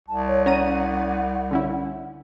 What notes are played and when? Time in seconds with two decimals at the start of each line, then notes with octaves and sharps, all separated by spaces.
0.08 C2 A5
0.28 C#5
0.46 C#4 F#5 A#5 D#7
1.51 D3 C#4 E4